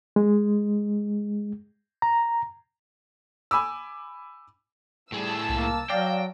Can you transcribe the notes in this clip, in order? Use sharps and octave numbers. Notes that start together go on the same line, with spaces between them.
G#3
A#5
G#5 B5 D6 E6
A2 G3 G#4 A5 E6
C2 A#3
F#3 D5 F5 G5 A#6